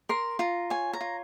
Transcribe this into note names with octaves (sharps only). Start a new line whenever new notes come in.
A#4 C6
F4 A#5
C#5 G#5
A#5
F4